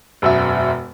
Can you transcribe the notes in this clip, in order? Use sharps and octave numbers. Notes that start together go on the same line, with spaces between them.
E1 F#2 E5